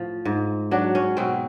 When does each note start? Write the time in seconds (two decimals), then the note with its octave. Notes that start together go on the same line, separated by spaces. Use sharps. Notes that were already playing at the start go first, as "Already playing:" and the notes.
Already playing: A2 F3
0.25 G#2
0.71 F#3 D4
0.95 C#4
1.17 B2 C4